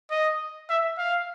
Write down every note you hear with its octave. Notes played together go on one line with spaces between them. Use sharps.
D#5
E5
F5